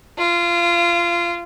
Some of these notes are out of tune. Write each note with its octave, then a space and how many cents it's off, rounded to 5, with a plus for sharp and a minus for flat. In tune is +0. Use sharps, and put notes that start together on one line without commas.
F4 -25